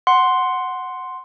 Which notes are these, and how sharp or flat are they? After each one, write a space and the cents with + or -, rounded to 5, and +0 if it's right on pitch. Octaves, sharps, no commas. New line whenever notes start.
F#5 +0 C6 +0